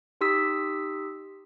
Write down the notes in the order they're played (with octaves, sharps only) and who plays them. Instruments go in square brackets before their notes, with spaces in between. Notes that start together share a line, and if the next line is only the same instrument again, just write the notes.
[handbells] D#4 G4 C6 D#6 E6 B6